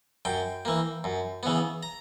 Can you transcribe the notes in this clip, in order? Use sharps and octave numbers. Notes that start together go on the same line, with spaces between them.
F#2 G5
E3 A#3
F#2
C#3 E3 B3
A#5